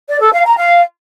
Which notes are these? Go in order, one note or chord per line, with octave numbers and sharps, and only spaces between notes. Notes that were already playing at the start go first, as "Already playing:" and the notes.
D5
A4
F5
A#5
F5